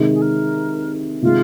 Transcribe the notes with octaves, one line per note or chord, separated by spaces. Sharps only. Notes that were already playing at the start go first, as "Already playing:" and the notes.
Already playing: C3 D#3 G#3
G#4
A#4
C3 D#3 G#3 F4